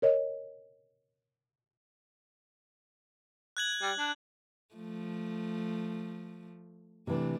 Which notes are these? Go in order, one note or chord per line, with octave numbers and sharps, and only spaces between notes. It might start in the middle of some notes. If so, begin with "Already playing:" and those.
A#4 C#5 D#5
F#6 G#6 F#7
G3
D4
F3 A3
C3 E3 A3 D4